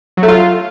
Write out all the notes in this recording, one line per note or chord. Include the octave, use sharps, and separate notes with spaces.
F#3
A3
F4